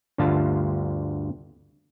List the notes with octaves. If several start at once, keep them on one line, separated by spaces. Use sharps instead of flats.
D2 G2 D3 F4 A5